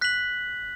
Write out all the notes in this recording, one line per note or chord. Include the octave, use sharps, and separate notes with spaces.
F#6 B6 F#7